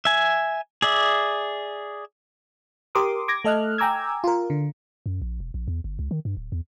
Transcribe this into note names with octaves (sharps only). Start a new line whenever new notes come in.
E5 G#5
G#4 D5 E5
G4 A#4 C6 D6 D#6
D6 G#6 A#6
A3 A4 D#5 F6 F#6
G5 G#5 A#5 D6 E6 G#6
F4 A#4
D3
F#2
A#1
E1
A#1
E2
G1
C#2
D#3
G2
D1
E2